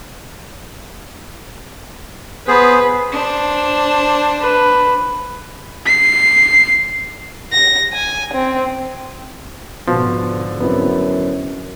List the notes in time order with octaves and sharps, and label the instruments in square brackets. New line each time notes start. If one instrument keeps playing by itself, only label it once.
[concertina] B3 G#4 C5 [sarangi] B4
[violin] D4 C5
[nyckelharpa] B4
[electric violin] C7
[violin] A#6
G#5
C4
[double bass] G#2 D3 [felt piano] B2 [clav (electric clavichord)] F3
[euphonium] F#2 [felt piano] B3 C4 E4